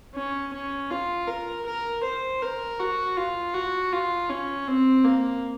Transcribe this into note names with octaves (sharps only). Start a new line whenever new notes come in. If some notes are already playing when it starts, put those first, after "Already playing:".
C#4
C#4
F4
A#4
A#4
C5
A#4
F#4
F4
F#4
F4
C#4
C4
A#3